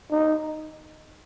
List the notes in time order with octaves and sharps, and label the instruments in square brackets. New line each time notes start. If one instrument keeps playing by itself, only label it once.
[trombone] D#4